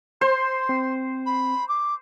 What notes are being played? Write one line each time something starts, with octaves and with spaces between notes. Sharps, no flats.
C5 C6
C4
B5
D6